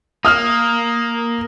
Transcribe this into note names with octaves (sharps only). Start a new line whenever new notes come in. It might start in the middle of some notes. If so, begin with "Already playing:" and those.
A#3 D#6 F6